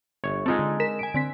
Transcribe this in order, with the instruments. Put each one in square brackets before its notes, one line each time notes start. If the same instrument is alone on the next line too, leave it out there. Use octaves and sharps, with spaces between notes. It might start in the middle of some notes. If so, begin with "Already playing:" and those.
[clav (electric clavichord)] G1 C#5
[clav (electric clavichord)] G#3 D#4 A4 [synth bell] C4 F4
[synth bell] D3
A#4 B6 E7
G#5 D7
D3 C4 B6